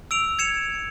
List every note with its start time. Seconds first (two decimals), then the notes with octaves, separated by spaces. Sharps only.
0.11 E6 D7 F7
0.39 G#6 C#7 E7 F7